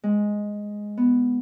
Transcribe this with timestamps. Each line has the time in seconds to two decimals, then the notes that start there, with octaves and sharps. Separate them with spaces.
0.03 G#3
0.97 B3